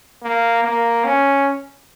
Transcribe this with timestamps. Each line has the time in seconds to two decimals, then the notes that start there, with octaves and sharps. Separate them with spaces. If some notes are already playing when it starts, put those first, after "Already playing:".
0.23 A#3
0.64 A#3
1.05 C#4